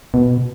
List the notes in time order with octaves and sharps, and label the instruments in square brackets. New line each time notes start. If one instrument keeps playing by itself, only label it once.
[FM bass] B2